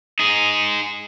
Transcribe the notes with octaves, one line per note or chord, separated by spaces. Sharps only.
D#4 G#4